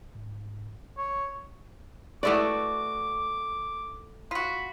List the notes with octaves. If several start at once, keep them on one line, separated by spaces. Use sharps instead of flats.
G#2
F#1
G#1 C#5
A3 B3 E4 F#4 D5 D6
F4 F#4 B5